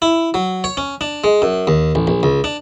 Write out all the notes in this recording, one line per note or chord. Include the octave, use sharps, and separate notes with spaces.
E4
F#3
C#5
C#4
D4
G#3
F#2
D#2
A1
A#1
C#2
D4